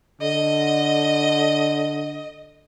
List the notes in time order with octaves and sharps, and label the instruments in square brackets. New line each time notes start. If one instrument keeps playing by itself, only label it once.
[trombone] D3 [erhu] D#5